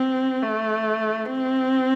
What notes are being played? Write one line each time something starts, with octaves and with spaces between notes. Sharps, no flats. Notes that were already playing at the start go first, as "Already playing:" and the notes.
Already playing: C4
A3
C4